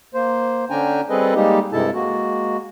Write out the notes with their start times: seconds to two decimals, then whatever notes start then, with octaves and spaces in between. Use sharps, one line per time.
0.14 A#3 C5
0.70 D3 C#4 D4 G5 G#5 A#5
1.10 G3 C4 G#4 A4 B4 D#5
1.35 G3 G#3 A#3 D#4 G4
1.72 G2 C3 G#3 E4 A4 A5
1.94 G#3 A#3 F#4